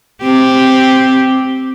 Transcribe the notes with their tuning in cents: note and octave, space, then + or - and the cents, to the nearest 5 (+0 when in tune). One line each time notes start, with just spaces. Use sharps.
C4 +0 G4 +0